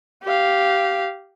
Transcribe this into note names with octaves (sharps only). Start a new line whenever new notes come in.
G4 F5